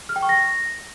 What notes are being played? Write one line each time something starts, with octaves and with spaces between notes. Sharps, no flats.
F6
G5
C#6
A#6